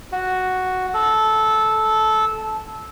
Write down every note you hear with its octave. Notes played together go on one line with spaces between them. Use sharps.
F#4
A4